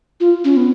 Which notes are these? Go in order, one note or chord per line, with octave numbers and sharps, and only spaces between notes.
F4
C#4
B3